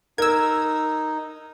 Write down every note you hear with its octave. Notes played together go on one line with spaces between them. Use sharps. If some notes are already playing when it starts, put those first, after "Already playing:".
D#4 A#4 E6 G#6